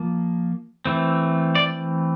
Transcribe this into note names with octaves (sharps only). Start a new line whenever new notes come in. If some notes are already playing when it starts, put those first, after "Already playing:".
Already playing: F3 A#3
E3 A3 C4
D5